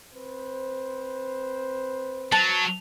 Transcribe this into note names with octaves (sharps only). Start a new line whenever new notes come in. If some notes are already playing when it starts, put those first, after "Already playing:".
C4 B4 C5
F#3 A5